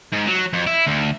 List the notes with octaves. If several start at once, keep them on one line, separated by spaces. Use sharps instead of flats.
G#2
F#3
F2
E4
D2